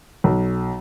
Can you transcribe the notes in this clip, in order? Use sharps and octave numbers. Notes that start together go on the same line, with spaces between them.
B1